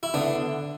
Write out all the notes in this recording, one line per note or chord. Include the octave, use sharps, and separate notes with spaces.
E4
D3 B3 D4